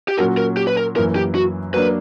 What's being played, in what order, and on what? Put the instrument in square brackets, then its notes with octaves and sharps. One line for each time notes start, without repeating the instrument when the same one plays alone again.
[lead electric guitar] G4
[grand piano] A#2 F#3 C#4 F#4 [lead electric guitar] A#4
[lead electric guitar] A#4
G4
B4
A#4
[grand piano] F#2 E3 A#3 [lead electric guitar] A#4
[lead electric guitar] G4
F#4
[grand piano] F#3 A#3 D4 [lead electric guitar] B4